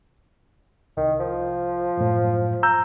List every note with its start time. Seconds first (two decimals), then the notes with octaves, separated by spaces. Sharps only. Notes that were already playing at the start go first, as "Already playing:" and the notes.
0.97 C2 D#3
1.20 F3
1.97 F#2 A2
2.63 A#5 E6 G6